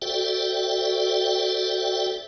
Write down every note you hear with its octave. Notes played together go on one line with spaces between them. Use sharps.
F#4 A4 C5 D5 E5 G5